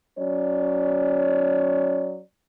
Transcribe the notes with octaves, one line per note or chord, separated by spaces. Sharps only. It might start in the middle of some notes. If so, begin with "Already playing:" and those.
F#3 C#4 C#5 D5